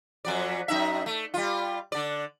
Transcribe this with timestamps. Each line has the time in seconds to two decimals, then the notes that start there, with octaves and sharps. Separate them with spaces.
0.25 F2 F#3 D5
0.68 F#2 D#4 E5
1.06 A3
1.34 G3 F4
1.92 D3 D5